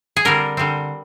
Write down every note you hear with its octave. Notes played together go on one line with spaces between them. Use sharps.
G#4
D3 G3 C4 A#4
D3 G3 C4